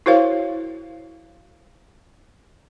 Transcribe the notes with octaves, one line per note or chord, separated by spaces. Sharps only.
E4 F#4 A#4 C5 C#5 F5